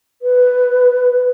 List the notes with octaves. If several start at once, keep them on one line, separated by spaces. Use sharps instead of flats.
B4